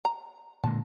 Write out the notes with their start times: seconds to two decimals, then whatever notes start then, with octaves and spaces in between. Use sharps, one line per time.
0.05 A#5
0.64 A#2 D3 G#3 A5